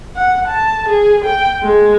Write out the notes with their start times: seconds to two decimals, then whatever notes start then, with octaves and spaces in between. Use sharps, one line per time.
0.15 F#5
0.48 A5
0.89 G#4
1.25 G5
1.63 G#3